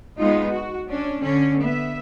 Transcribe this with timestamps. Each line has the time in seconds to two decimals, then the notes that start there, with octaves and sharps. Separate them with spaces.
0.19 G#3 B3 D#4 F4
0.50 F#4
0.91 C#4 D4
1.23 D3 C#4
1.63 B3 E5